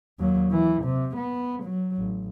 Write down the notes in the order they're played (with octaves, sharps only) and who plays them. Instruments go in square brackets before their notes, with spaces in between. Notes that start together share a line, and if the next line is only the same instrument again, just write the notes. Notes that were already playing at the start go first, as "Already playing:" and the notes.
[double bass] D#2 F#3
E3
C3
B3
F#3
A1